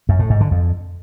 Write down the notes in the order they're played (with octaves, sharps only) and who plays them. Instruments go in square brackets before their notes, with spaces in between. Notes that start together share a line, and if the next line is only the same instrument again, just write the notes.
[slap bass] F#2
A2
G#2
D3
F2